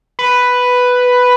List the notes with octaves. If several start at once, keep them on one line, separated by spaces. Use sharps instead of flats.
B4